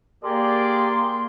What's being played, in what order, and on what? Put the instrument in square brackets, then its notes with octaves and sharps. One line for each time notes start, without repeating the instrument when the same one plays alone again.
[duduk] A#3 [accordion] G4 A#4 [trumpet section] G#4 D5 [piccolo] C6